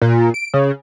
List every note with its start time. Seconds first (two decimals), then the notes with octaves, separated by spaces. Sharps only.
0.02 A#2
0.34 D7
0.54 C#3